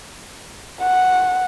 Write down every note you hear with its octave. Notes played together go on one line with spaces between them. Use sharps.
F#5